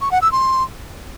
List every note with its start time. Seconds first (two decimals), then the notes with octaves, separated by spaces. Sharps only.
0.01 C#6
0.11 F#5
0.22 E6
0.32 C6